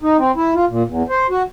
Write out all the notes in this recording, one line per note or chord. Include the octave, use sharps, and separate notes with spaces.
D#4
C4
E4
F4
A#2
E2
C5
F#4